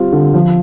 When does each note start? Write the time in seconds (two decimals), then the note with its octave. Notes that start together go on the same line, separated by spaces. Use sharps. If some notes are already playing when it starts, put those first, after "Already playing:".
Already playing: G3 C4 F4
0.12 D3
0.34 F3